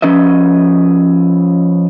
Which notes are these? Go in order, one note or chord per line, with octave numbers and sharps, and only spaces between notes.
F3 C#4 B4 D#5 E5